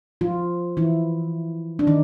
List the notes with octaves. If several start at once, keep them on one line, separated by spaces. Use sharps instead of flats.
F3 F4
E3 E4
D4
D#3 D#4